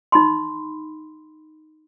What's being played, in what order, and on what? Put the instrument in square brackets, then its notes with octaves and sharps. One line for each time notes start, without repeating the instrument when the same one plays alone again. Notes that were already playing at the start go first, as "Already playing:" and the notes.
[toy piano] D#4 B5 C6